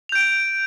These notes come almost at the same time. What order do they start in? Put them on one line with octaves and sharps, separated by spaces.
F7 G6 D7